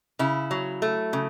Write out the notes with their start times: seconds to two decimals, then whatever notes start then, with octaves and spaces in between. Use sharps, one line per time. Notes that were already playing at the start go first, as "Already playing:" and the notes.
0.19 C#3 E4
0.51 F#3
0.82 A3
1.13 C#3